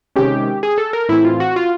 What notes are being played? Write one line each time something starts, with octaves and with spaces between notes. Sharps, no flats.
C3 D#3 G#3 C#4 G4
G#4
A4
A#4
A2 E3 A3 C4 E4
F4
F#4
F4